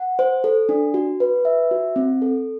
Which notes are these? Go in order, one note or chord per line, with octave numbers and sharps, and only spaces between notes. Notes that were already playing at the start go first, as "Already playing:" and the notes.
Already playing: F#5
C5
A4
D4
F#4
B4
E5
F#4
C4
A4